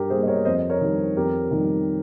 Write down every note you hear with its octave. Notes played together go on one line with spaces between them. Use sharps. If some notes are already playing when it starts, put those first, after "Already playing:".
Already playing: G2 G4 A#4
G3 A#3 G#4 C5
D#5
A#4 C#5
F2 C5 D#5
A#4 C#5
D#3 G3
F2 G4 A#4
D#3 G3